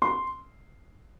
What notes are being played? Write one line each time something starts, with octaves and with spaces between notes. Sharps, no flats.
C6